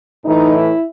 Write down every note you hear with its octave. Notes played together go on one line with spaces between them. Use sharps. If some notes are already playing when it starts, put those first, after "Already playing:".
A2 E3 D#4
E4